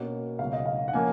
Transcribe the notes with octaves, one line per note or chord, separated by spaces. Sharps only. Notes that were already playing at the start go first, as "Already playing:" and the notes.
Already playing: B2 A#3 C#4
C#2 B2 F#3 F5
D#5
F5
F#5
F3 A#3 C#4 G#5